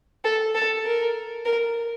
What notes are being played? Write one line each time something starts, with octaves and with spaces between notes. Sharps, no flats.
A4
A4
A#4
A#4